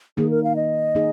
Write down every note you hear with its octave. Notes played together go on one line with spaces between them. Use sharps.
D#3 A#3 D#4 G#4
A#4
F5
D#5
D#3 A#3 D#4 G#4